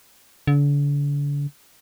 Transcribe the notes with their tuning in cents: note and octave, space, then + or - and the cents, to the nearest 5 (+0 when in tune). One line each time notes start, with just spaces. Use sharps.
D3 -40